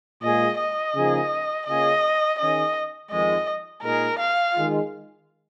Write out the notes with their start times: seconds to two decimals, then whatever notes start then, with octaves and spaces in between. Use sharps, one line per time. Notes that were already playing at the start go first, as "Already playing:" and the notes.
0.22 A#2 G#3 F4 G#4 D#5
0.59 D#5
0.95 C#3 F3 A#3 D#4 G#4
1.67 C#3 A#3 C#4 F4 G#4 D#5
2.39 D#3 C#4 G#4 D#5
3.11 F2 D#3 G#3 D#5
3.82 A#2 G#3 D#4 G#4 A#4
4.19 F5
4.54 D#3 G#3 F4